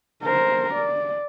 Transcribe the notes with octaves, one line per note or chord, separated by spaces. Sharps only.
A#4 C5
D5